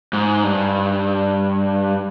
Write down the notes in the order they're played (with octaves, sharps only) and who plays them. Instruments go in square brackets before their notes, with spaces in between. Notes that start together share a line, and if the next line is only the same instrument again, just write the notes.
[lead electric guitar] G#2
G2